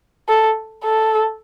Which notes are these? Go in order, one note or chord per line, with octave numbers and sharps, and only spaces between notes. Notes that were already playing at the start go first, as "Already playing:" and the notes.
A4
A4